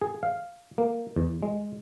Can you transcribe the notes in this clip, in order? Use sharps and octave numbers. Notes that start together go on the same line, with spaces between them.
G#4
F5
A#3
E2
G#3